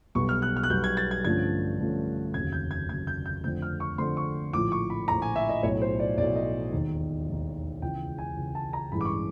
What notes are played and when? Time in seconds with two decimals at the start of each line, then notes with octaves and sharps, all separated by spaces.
0.15 B1 B2 G3 B3 C#6
0.29 F6
0.42 F#6
0.56 F6
0.63 F#6
0.70 B1 B2 G3 B3 G6
0.84 G#6
0.97 A6
1.11 G#6
1.25 G2 D3 F3 A3 C#4 G#6
1.79 G2 D3 F3 A3 C#4
2.34 F1 D#2 C#3 F#3 G#6
2.52 G6
2.71 G#6
2.89 F1 D#2 C#3 F#3 G#6
3.07 G6
3.26 G6
3.44 F2 D3 F3 A3 C4 G6
3.62 F6
3.80 C#6
3.98 F2 D3 F3 A3 C4 C6
4.17 C#6
4.53 A#1 A2 F3 D6
4.72 C#6
4.90 B5
5.08 A#1 A2 F3 A#5
5.22 G#5
5.36 E5
5.49 D#5
5.63 B1 A2 F#3 C#5
5.82 C5
6.00 D5
6.18 B1 A2 F#3 D5
6.36 D#5
6.73 E1 D#2 D#3
7.27 E1 D#2 D#3
7.82 C#2 C#3 E3 G5
8.18 G#5
8.36 C#2 C#3 E3
8.55 A5
8.73 A#5
8.92 A1 G2 E3 G#3 B5
9.01 D6
9.05 C#6